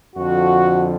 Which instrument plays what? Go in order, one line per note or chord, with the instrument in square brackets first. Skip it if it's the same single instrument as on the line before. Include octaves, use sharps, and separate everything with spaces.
[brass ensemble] F2 D3 F3 F#4